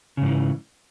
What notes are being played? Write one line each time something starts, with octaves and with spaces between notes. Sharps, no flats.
G#2 C#3 E3